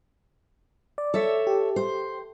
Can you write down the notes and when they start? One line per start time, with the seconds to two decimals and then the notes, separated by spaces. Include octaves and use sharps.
0.98 D5
1.14 A4 C#5 E5
1.47 G4
1.76 C5